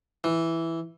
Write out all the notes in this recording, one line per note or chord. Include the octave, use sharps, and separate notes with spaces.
E3